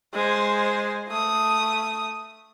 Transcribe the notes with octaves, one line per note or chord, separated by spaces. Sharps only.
G#3 C5
A3 D#6